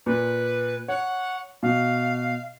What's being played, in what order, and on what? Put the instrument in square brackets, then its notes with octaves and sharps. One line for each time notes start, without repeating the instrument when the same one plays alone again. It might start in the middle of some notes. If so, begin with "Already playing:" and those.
[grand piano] A#2 [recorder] B4
[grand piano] C#5 [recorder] F#5
[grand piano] B2 [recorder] F5